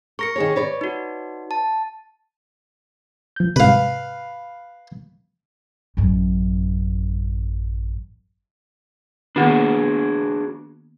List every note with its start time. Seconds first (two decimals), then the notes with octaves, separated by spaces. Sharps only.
0.19 A#4 C#6 A#6 C#7
0.36 D#3 G#4 C#5
0.56 B4 C#5 D5
0.81 D#4 F#4
1.51 A5
3.36 F3 G6
3.56 G#2 C3 B4 F5
5.97 A1 F#2
9.36 D#3 A#3 B3 D4 F#4 G#4